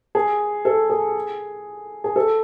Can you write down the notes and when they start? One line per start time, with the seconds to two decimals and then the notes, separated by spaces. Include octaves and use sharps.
0.15 G#4
0.65 A4
0.90 G#4
2.04 G#4
2.16 A4